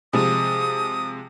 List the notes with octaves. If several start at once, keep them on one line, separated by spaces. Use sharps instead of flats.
C3 F3 G#3 D#6